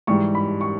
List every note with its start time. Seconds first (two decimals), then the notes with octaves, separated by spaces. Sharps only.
0.07 G#2 E3 G3 C#6
0.35 B5
0.61 C#6